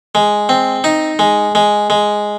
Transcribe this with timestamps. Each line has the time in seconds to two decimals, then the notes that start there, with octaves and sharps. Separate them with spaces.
0.15 G#3
0.49 C4
0.84 D#4
1.19 G#3
1.55 G#3
1.90 G#3